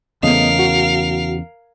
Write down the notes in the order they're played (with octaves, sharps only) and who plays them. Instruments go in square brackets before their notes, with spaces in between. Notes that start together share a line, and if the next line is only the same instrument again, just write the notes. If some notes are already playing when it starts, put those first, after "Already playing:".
[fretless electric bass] E2 C#3 A3 [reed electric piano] B3 D#5 [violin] A#4 F5
[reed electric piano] F#4